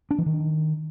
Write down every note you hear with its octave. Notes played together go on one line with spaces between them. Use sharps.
D4
E3
D#3